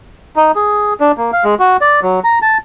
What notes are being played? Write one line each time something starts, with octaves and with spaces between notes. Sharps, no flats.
D#4
G#4
D4
A#3
F5
G#3
F#4
D5
F#3
A#5
A5